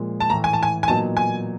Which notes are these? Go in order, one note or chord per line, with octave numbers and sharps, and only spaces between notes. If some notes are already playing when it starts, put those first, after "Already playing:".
Already playing: A#2 F3 G#3
A5
A2 E3 A3 A#5
G#5
A5
G#5
G#5
A#2 F#3 B3 D#4 A5
G#5